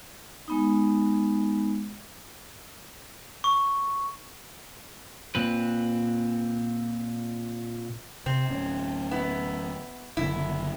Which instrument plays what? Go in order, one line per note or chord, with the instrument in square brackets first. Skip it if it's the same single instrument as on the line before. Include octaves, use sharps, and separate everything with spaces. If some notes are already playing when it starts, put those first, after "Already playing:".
[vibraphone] G#3 B3 D#4
[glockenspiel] C#6
[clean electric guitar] A#2 C4 B4
[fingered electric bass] C3 [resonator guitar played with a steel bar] C4
[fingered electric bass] D1 C#4
[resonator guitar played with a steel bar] B3 E4
[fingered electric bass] F#1 B2 D3 [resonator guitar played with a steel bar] E4